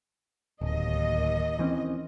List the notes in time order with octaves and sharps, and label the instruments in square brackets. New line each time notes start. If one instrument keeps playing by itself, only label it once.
[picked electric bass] D1 [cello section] D#2 D#5
[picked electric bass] E3 C4 C#4